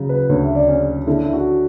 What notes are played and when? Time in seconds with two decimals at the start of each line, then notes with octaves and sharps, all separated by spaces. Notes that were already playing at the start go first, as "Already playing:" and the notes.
Already playing: C#3 F#3
0.09 B4
0.29 D2 C#5
0.43 E5
0.55 D5
0.68 C#4
1.06 D3 E4
1.24 E4
1.33 F#4